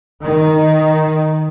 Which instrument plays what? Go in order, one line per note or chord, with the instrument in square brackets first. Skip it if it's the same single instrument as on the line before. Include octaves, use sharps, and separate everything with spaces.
[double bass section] D#3